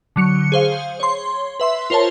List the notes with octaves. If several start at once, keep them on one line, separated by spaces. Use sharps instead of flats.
D3 F#3 C#7
G#4 C5 F5
C#5 C6
B4 E5 C6
F4 A#4 C5 C#5 A5